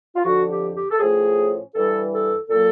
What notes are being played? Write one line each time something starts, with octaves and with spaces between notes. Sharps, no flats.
F4
F2 D3 F3 F#4
G4
G4
A4
A2 F3 A3 C#4 G#4
G2 E3 G3 A4
A4
A#2 F#3 A#3 A4